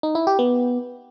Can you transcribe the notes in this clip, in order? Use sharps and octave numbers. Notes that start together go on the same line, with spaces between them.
D#4
E4
G4
B3